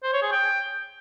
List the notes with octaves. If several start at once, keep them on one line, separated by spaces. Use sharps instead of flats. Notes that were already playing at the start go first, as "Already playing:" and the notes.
C5
C#5
G#4
G5